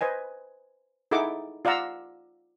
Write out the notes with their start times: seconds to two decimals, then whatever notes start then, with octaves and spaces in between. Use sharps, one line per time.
0.01 B4 C5 D#5 G#5
1.11 D#4 E4 G#4 A4 F#5 D6
1.65 F4 D5 F5 F#5 A#5 E6